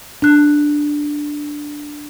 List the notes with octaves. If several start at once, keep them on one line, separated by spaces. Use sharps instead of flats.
D4 F#6